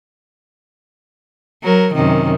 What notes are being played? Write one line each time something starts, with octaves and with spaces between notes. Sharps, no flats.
F#3 A#4
F#2 C3 D#3